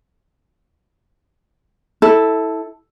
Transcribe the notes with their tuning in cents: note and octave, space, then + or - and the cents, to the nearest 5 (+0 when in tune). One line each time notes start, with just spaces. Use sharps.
E4 -20 A4 +0